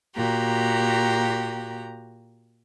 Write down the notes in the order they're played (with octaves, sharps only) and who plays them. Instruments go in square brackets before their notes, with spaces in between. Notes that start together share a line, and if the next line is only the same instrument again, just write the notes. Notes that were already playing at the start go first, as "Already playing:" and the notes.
[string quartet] A#2 F#4 G4 A#5